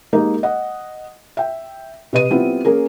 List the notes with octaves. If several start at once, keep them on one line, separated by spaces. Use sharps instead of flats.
G#3 A#3 D#4 G4
D#5 F#5
E5 G5
C3 B4 D#5 D#7
G3 B3 C4 E4 F4
A#3 C#4 G#4 A#4